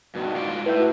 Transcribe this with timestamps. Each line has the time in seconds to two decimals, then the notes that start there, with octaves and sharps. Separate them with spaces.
0.15 G2 B2 D#3 F#4
0.36 G#2 F4 D5
0.66 A2 E4 B4 E5 G6
0.79 F#4